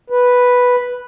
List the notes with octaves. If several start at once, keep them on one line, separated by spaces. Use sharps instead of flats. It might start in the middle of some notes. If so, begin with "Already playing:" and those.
B4